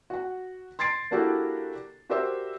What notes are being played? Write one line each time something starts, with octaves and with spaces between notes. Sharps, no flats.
F#4 F#5
C6 G#6 A6 C7 D7
A#3 D4 E4 F#4 G4 A4
F#4 G4 A#4 C5 D5 E5